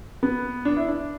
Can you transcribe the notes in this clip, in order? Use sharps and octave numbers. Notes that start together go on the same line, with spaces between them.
B3
D4
E4
D4